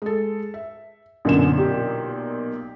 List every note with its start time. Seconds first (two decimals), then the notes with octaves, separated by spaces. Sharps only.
0.02 G#3 A4
0.54 E5
1.25 B1 F#2 A#2 D3 E7
1.58 G4